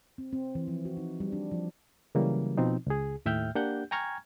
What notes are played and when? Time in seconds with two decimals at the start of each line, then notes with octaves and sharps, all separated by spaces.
0.18 C4
0.33 C4
0.55 E3
0.68 F3
0.85 F#4
0.97 D#4
1.20 G3
1.33 D4
1.51 F3
2.15 C#3 E3 F#3 G3 A#3
2.58 B2 F3 C4 D#4
2.87 C#2 G#4
3.26 D#2 A2 E5 G5 F6 G6
3.55 A#3 D4 G4 F#5 G6
3.91 G5 G#5 A#5 C#6 F6 G#6